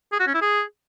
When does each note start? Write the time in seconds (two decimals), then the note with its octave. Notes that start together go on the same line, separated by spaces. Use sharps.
0.12 G#4
0.20 F#4
0.27 C#4
0.34 E4
0.42 G#4